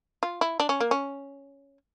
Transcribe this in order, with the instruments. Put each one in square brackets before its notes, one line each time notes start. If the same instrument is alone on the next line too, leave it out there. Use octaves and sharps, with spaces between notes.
[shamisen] F4
E4
D4
C#4
A#3
C#4